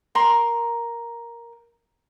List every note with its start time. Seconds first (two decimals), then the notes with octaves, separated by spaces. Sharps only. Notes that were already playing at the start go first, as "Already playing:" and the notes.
0.15 A#4 A#5 C6